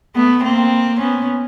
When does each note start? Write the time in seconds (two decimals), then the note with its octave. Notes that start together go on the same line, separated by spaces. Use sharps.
0.15 A3 B3
0.43 A#3 C4
1.00 B3 C#4